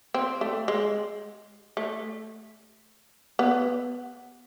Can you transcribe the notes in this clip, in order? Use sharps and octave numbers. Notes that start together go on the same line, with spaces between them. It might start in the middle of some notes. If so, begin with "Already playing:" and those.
C4
A3
G#3
A3
B3